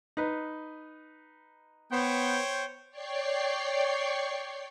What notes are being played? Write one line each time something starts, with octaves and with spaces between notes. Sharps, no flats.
D#4 B4
B3 C5 C#5 G5
C#5 D5 G5 C#6 C7